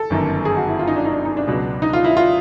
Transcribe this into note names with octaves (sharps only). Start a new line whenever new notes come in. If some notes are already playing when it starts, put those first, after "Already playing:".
Already playing: A4
G1 F#2 D#3
G#4
F#4
E4
F4
D#4
D4
D#4
D4
D#4
D4
C#2 B2 F#3
D#4
F4
E4
F4